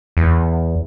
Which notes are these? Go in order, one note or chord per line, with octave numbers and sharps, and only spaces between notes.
E2